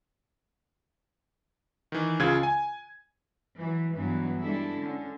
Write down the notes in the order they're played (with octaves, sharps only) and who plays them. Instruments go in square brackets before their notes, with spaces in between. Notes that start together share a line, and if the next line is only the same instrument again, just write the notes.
[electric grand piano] D#3 E3
C#2 C#3 F4 G#6
G#5
[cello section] E3 F#3
G2 E3 F#3 G3 B3
G3 G#3 D4 E4 A4
D3 C#4